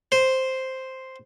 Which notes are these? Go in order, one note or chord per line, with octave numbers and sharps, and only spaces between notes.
C5